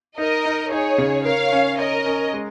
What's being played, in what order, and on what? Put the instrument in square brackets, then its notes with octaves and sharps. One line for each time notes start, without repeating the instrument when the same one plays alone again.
[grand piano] D#4 [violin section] A#4 D#5
[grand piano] D#4
[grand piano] D#4 [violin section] G#4 C#5
[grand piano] C#3
[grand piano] A#4 [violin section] C#5 F5
[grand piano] C#4
[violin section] A#4 D#5 [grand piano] C#5
[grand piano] C#4
G#3